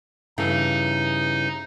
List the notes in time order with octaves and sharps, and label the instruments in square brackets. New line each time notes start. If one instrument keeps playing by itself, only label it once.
[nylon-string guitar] G2 C#3 E3 [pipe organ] D#4